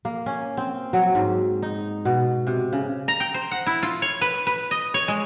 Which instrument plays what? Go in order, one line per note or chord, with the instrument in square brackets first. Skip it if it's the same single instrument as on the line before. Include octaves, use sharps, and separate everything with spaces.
[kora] A#3
C#4
C4
F#3
G#2
D#4
B2
C3
C#3
[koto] A#5
G5
C5
F#5
E4
F4
C#5
B4
B4
D#5
C#5
G#3